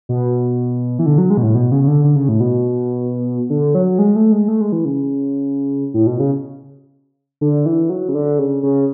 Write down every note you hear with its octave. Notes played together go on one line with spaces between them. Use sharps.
B2
E3
D3
F#3
G#3
B2
A2
B2
C#3
C#3
D3
D3
C#3
A2
B2
D3
F#3
G#3
A3
G#3
A3
G#3
E3
C#3
A2
B2
C#3
D3
E3
F#3
C#3
D3
C#3
C#3